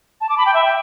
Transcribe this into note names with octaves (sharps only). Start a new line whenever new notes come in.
A5
D6
B5
G5
E5
G5